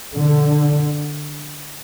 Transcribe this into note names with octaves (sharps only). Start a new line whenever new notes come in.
D3